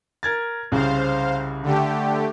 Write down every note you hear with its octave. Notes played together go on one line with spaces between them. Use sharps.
A#4 G#6 A6
C2 C#3 C5 F5
D3 A3 G4